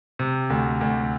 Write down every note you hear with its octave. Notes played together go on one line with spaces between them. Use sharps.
C3
D2
D2